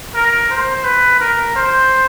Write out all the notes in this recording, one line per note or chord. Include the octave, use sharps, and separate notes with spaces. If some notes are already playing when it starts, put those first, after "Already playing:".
A#4
C5
B4
A#4
C5